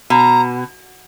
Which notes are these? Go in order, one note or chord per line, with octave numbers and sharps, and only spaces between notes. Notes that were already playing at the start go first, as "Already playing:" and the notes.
B2 A#5